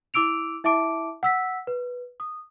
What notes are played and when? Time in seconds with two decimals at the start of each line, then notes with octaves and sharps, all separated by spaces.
0.14 E4 D6 E6 D7 F7
0.64 E4 E5 A5 D6 D7
1.23 F#5 E6 B6
1.67 B4
2.20 D#6